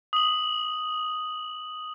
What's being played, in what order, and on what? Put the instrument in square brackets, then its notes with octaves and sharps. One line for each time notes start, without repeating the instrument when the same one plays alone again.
[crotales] D#6 F#7